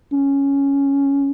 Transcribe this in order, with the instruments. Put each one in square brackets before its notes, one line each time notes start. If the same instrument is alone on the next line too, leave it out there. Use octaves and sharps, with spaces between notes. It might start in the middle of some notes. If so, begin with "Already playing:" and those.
[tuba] C#4